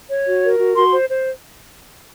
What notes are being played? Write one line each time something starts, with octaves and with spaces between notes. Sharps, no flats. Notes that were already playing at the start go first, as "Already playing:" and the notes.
C#5
F#4
A#4
F#4
F#4 C6
C5
C5